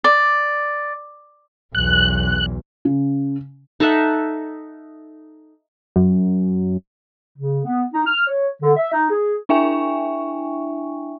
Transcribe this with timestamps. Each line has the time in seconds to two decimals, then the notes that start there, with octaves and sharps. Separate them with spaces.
0.04 D5
1.75 B1 E2 F#6
2.85 C#3
3.80 D#4 A4 E5 F#5
5.96 F#2
7.38 C#3
7.64 B3
7.93 D#4
8.07 F6
8.27 C#5
8.62 D3
8.77 E5
8.93 D#4
9.10 G#4
9.49 D4 E4 E5 G5 G#5 C#6